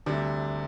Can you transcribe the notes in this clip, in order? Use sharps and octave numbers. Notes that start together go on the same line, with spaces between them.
D2 C3 G3 D4